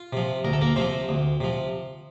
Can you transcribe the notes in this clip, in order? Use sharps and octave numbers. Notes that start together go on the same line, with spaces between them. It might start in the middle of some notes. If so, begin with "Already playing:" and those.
Already playing: F4
C3 F3
D2 A#4
A4
A#3 A#4
C3 F3 C4 C5
D2
C3 F3